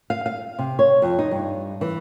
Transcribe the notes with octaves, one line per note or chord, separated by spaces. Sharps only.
F5
F5
C3
C#5
F2
D#4
G2
E3